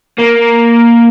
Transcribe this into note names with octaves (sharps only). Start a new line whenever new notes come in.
A#3